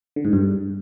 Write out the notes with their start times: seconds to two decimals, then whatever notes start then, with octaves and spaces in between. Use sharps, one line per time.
0.16 D3
0.25 G#2
0.33 G2